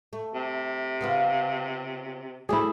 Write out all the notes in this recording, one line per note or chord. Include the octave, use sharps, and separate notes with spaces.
A3
C3
C#3 B3 F4
A3 E4 G#4 D5